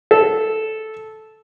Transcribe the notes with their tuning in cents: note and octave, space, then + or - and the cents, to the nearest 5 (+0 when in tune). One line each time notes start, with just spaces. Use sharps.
A4 -10